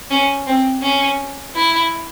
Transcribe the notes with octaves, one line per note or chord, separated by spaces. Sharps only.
C#4
C4
C#4
E4